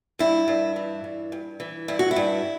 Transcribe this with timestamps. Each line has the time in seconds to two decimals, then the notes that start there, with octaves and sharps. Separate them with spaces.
0.19 G2 E4
0.48 G2
0.76 E3
1.04 G2
1.32 G2
1.60 E3
1.88 G2 E4
1.99 F#4
2.11 E4
2.16 G2